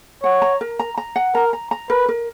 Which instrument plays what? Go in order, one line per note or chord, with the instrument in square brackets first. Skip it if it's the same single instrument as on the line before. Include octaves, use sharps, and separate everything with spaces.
[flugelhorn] C#5 [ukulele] F#5
[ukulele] A#5
A#4
A#5
A#5
F#5
[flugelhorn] A#4 [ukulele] A#5
[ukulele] A#5
A#5
[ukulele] A#4 [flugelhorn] B4
[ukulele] A#4